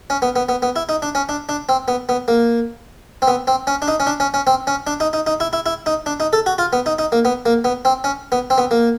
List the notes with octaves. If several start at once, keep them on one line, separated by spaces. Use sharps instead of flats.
C#4
B3
B3
B3
B3
E4
D#4
D4
C#4
D4
D4
C4
B3
B3
A#3
C4
B3
C4
C#4
D4
D#4
C#4
D4
C#4
C#4
C4
C#4
D4
D#4
D#4
D#4
E4
E4
E4
D#4
D4
D#4
A4
F#4
F4
B3
D#4
D#4
A#3
B3
A#3
B3
C4
C#4
B3
C4
B3
A#3